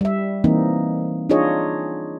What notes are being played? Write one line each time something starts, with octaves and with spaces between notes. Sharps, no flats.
G3 E5
E3 A#3 C4 D#4
D4 D#4 F4 G#4 C#5 D#5